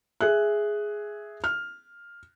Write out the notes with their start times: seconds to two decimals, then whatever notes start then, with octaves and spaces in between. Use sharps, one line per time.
0.21 G#4 E5 F#6
1.44 F6